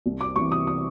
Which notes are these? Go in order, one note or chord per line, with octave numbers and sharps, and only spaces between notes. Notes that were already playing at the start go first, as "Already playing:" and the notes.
C2
D6
C3 E3 G3 C#6
D#6
D#6